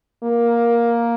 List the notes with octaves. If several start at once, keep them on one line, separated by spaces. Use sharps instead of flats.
A#3